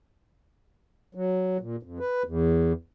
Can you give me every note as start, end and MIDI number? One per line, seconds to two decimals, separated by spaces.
1.15 1.57 54
1.61 1.76 46
1.83 1.99 41
2.00 2.23 71
2.25 2.72 40